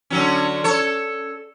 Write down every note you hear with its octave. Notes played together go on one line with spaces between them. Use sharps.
D3 F#3 C#4
A4 C#5